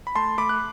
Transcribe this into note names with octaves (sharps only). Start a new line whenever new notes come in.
B5
A3 A5 C6
A3 B5 D6
F#6